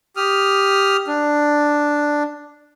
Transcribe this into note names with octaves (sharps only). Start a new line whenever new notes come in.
G4 D#6 F6
D4